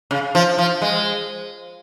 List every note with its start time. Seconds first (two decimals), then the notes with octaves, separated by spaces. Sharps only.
0.11 C#3
0.35 F3
0.58 F3
0.82 G#3